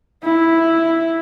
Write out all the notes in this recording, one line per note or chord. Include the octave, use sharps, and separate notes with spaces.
E4